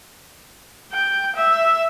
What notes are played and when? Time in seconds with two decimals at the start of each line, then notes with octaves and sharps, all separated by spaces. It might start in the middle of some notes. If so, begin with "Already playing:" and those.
0.92 G5
1.36 E5